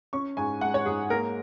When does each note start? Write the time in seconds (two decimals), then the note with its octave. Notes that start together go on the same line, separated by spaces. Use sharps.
0.13 C#4 C#6
0.37 G#2 G#5
0.61 G#3 F#5
0.74 C#5
0.86 G#2 G#4
1.10 A#3 A#4